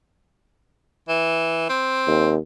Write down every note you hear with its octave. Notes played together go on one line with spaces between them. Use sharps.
E3
C4
D#2